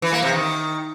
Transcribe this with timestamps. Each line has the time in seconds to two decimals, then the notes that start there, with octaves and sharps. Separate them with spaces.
0.02 E3
0.12 A#3
0.22 C3
0.32 D#3